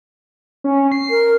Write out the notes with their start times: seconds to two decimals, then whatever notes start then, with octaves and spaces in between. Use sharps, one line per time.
0.64 C#4
0.92 C7
1.10 A#4